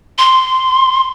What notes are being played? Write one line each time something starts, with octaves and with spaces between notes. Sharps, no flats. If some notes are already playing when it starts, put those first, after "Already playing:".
C6